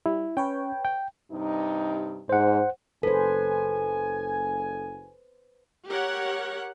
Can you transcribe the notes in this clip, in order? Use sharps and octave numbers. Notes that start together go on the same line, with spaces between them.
G3 E4
C#4 B4 C#5 G5
G5
G2 C3 D#4
G#2 C5 F#5
F#1 A4 B4 C5 G#5
G4 A#4 C#5 F#5